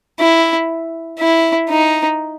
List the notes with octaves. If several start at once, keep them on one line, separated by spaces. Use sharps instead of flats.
E4
E4
D#4